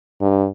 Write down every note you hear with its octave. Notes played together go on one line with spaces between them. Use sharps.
G2